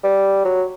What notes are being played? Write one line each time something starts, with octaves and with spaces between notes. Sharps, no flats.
G3
F#3